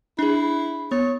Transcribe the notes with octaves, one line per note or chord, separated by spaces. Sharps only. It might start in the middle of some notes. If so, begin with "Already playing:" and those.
D4 E4 G#4
B3 C#5